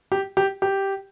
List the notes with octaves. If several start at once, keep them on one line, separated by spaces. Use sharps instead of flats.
G4
G4
G4